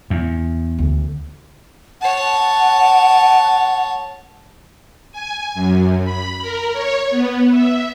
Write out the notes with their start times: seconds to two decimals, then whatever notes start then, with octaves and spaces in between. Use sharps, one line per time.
0.10 E2
0.79 D2
2.02 C#5 F#5 A5
5.12 G#5
5.54 F#2
6.04 B5
6.41 A#4
6.73 C#5
7.11 B3
7.50 E5